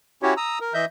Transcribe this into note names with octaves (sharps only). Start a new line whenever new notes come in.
C#4 E4 F#4 G4 C#5
A#5 D#6 E6
A#4
E3 D#5 E5 G6